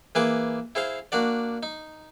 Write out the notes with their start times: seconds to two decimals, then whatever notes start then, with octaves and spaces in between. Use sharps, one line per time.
0.15 E3 A#3 G#4 B4 G#5 D6
0.75 E4 G#4 C5 F5
1.12 A#3 D4 F#4 D5
1.63 D#4